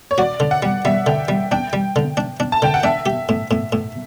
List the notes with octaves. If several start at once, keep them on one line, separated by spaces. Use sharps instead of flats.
C#5
F#4 D5
D3
F#5
G3
G3 E5
D3 G5
G3
D4 G5
G3
D3
D4
D4
A5
D3 G5
F#5
D4 E5
G4
A2
A2
A2